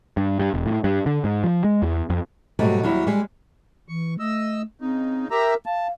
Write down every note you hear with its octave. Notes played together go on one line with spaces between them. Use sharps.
G2
G2
E1
A2
G2
D3
G#2
F3
G#3
E2
F2
G#2 B2 F#3 G3 A3
D#2 F#3 G3 E4
G3 G#3
E3 C#6
A3 D#5 E6
C#3 C4 D#4
G4 A#4 E5 A#5
F5 A5